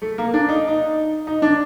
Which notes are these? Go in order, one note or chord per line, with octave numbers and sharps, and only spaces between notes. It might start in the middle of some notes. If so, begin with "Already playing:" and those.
A3
A#3
D4
D#4
D#4
D#4
D4